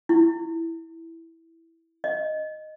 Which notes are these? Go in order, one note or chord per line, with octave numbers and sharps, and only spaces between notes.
E4
D#5